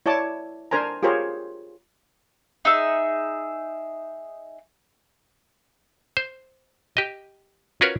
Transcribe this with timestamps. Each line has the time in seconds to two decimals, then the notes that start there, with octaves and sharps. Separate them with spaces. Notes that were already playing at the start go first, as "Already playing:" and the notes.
0.06 E4 C#5 D5 A5 D6
0.71 D4 A#4 C5 G#5 A#5
1.03 F4 G4 G#4 A#4 C5 C#5
2.65 D#4 G#4 E5
6.17 C5
6.97 G4 D#5
7.81 C#4 F4 F#4 A#4 B4 C#5